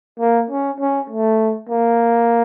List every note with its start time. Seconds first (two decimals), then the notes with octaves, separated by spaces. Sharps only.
0.20 A#3
0.50 C#4
0.80 C#4
1.10 A3
1.69 A#3